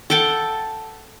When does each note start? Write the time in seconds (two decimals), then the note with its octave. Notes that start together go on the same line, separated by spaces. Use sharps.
0.10 A4 F#5 G5 A5